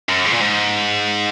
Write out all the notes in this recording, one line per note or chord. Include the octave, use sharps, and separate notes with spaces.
F#2
G#2
A#2
G#2